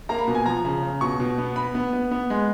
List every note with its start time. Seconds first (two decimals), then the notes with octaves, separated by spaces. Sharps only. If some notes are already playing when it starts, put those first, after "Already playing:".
0.09 A#3 A#5
0.18 B5
0.28 B2
0.35 G#5
0.46 F3 A#5
0.65 C#3
0.82 C#3
1.01 B2 C#6
1.20 B2
1.38 B3
1.56 B3 B5
1.75 B3
1.93 B3
2.11 B3
2.30 G#3